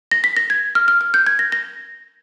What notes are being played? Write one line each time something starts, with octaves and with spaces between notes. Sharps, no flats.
A#6
B6
A#6
G#6
F6
F6
F6
G6
G#6
A#6
A#6